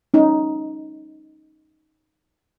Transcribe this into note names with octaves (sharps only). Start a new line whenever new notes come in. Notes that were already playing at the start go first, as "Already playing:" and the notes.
C#4 D#4